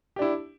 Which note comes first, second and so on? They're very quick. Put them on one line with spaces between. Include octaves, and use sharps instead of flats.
G4 D4 E4